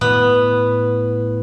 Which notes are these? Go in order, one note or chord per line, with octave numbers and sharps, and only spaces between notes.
A2 B3